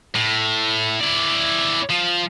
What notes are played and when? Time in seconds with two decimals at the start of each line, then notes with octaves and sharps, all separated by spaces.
0.15 A2
1.01 E4 D5
1.90 F3